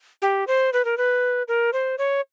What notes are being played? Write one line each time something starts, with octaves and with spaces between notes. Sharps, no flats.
G4
C5
B4
A#4
B4
A#4
C5
C#5